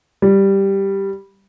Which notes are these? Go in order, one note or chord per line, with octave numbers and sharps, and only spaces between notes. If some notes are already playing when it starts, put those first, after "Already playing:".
G3